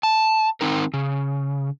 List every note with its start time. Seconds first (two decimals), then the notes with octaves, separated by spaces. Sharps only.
0.03 A5
0.61 D#3 C4 D#4 A#4
0.94 C#3